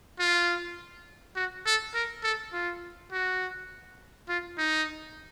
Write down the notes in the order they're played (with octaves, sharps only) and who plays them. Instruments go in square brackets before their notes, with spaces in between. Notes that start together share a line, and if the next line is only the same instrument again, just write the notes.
[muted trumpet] F4
F#4
A4
A#4
A4
F4
F#4
F4
D#4